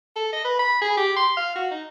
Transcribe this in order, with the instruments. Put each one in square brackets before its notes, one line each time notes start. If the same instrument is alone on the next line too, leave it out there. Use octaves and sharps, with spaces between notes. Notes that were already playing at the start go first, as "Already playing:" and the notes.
[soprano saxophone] A4
D#5
B4
B5
G#4
G4
C6
F5
F#4
D#4